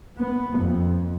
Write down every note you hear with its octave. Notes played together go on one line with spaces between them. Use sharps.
B3
F2